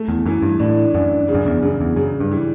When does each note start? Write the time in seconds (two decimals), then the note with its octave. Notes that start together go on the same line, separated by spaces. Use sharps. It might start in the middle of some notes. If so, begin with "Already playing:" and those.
Already playing: A3
0.08 E2
0.26 F#2 E3
0.42 G2
0.60 A2 D4
0.94 F#2 D4
1.28 C#3
1.35 F#2
1.46 E2
1.63 F#2 C#3
1.81 E2
1.96 F#2 C#3
2.20 G2
2.31 E3